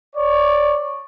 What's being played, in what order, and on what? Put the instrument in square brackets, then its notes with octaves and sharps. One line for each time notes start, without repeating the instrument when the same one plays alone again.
[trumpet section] C#5 D5